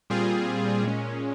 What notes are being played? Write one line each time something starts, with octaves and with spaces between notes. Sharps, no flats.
A#2 G3 C4 F4 G#4
A#2 G#3 C#4